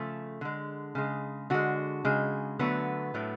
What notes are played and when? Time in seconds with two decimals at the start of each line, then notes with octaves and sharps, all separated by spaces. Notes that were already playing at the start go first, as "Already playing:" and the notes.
Already playing: C#3 F3 A3
0.41 D3 G#3
0.95 C#3 G#3
1.50 D3 G#3 F#4
2.05 C#3 G#3
2.59 D3 F#3 A3 B3
3.14 A2 F#3 A3